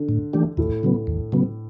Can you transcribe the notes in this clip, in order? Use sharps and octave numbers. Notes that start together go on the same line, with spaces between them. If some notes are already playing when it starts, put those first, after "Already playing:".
Already playing: D3
A2
E3 A3 D4 G4
D#2 A2
C#3 F#3 B3
D#2
C#3 F#3 B3